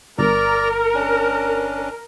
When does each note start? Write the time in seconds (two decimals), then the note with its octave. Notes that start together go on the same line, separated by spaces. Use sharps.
0.19 G1 A#4 D5 A#5
0.94 C#4 D4